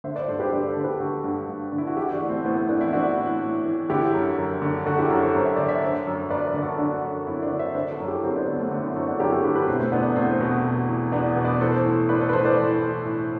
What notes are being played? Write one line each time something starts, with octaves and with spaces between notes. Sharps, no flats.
D3 C5 E5
B4 D5
G2 A4 C5
G4 B4
G2 B4 D5
A4 C5
D3
G4 B4
D3 F#4 A4
G2
G2
D3
E4
F#4
E3 E4 G4
D4 F#4
A2
A3 C4
A2 B3
B3
E3 B3 D4
C4 E4
E3 D4 F#4
A2
A2
E3
D3 E4 G4
F#2
F#2
D3
D3 F#4 A4
E4 G4
F#2
A4 C5
F#2
E5
D3 D5
C5 E5
D3
F#2
F#2 B4 D5
B4 D5
D3
F#4 A4
D3 D4 F#4
F#2
F#2 C4 E4
D4 F#4
D3
C5 E5
D3 B4 D5
F#4 A4
F#2
E4 G4
F#2 C4 E4
B3 D4
D3 B3
A3 C4
D3
C4 E4
F#2 F#4 A4
D4 F#4
F#2 E4 G4
F#4 A4
D3 G4 B4
G4 B4
B2 C4 E4
A3 C4
E2 B3 D4
B3 D4
E2 A3 C4
B2
B2
E2
E2 B3 D4
B2
B4 D5
E3 A4 C5
A2
A2 B4 D5
A4 C5
B4
E3 A4 C5
B4 D5
E3
A2
A2